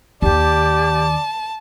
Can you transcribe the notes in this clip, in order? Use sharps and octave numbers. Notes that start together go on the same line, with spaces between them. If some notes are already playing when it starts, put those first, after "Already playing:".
D#2 D#3 G4 D5 A5